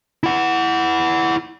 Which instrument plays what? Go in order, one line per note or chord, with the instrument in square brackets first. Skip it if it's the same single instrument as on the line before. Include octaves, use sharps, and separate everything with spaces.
[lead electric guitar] E4 F#5